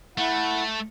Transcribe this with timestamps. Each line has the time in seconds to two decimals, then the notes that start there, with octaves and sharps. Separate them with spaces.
0.18 A3 E4 F#5